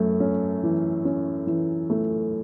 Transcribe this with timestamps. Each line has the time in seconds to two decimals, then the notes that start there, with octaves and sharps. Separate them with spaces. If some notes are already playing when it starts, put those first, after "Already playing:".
Already playing: F#2 A3
0.20 C#4
0.63 E3
1.05 C#4
1.47 E3
1.90 A3